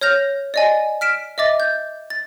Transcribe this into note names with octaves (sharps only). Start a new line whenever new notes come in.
C#5 F6 G6 A#6 F7
D5 D#5 G#5
F6 B6 D7 E7
D#5 E5 D6 A6
G6
A6